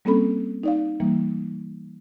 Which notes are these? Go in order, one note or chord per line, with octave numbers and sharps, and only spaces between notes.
G3 A#3 C4 C#4 A4 B5
D#4 D5 F5
E3 G3 A#3